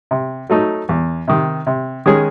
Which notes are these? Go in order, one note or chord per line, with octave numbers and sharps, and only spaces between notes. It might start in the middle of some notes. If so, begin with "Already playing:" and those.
C3
F#3 A3 D#4
E2
C3 D#3
C3
D#3 G#3 C#4 G#4